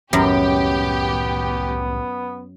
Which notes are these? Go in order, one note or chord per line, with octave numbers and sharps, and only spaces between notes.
C2 F#2 A2 D#3 B3 G4